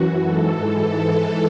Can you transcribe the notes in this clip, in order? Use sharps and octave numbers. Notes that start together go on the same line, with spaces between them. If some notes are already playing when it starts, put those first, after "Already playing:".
Already playing: F#2 E3 F#4
G#2 E3 A4